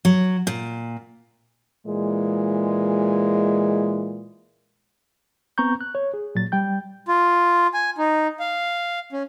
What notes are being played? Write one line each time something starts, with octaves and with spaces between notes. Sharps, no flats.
F#3
A#2
A#2 E3 G#3
B3 C4 A#5 C#6 G6
F#6
C#5
G#4
A#2 F#3 A6
G3 G5 G6
F4
G#5
D#4
F5
C#4